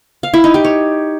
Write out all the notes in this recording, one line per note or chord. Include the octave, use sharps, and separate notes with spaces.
F5
E4
D#4
G4
C#5